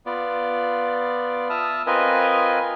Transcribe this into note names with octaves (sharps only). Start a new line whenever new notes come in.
B3 F4 D5
E5 A5 D#6 F6
C4 F4 A#4 B4 D#5 G#5